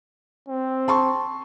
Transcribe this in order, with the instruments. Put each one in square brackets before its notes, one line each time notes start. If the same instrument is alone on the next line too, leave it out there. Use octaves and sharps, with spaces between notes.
[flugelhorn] C4
[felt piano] A5 C6 C#6